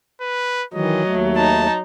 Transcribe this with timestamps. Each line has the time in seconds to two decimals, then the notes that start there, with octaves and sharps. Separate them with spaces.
0.21 B4
0.74 D#3 E3 F#3 D#5
1.07 D#2 A3
1.37 D#4 A5